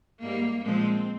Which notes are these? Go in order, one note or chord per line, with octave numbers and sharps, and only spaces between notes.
G#2 G3 A#3
A#2 F3 G#3 C4